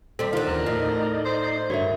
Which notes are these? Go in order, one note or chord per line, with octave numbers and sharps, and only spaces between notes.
D#2 G3 C4 A4
D3 D#3 D#4 F4
D#2 E3 A#4 F#6
A2 D#4 D5 D#5
C5
G2 D3 F#4 A#4 C#5 E5